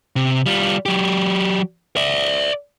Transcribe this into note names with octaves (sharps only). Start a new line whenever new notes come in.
C3
G3 F4
F#3 G4
D5 E5